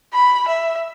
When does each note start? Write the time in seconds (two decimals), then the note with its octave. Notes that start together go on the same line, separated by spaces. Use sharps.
0.14 B5
0.48 E5